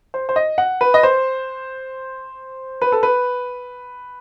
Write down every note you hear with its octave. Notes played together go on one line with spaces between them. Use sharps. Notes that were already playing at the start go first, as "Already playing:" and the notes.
C5
C5
D#5
F#5
B4
D#5
C5
B4
A4
B4